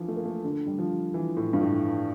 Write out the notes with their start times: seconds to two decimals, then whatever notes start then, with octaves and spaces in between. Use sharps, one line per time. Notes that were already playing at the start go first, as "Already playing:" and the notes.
Already playing: D3 E3 F3
0.08 A3
0.16 A#3
0.25 A3
0.44 D3
0.66 G3
0.79 F3
1.14 E3
1.37 A2
1.53 G2
1.61 A2